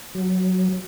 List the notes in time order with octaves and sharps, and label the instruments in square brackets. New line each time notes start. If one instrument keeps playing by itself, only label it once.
[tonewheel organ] F#3